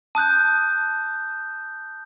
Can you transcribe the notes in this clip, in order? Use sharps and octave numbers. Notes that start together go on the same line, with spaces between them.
A5 D#6 F#6 G6